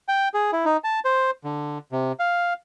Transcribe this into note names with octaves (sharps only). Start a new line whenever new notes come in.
G5
G#4
E4
D#4
A5
C5
D3
C3
F5